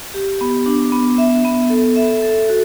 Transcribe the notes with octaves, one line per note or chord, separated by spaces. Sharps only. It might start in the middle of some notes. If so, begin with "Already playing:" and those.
G4
B3
D4
B3
E5
B3
A4
E5
A4
F#4